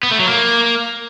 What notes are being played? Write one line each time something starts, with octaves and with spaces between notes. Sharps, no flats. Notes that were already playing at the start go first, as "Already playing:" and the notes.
B3
A3
F#3
A#3